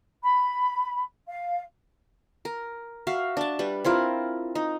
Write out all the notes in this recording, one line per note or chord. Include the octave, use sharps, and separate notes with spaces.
B5
F5
A#4
F#4 E5 F5
D4 A5
G3 B4
C4 E4 F4 A#4
D#4